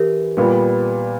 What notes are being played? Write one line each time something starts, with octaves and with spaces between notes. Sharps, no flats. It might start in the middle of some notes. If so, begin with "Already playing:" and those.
Already playing: E3 G4 A#4
A#2 G3 B3